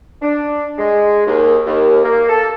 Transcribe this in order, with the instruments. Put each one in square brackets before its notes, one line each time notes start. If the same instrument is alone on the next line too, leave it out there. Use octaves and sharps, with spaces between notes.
[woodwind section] D4
G#3
D#2
D#2
A#3
A4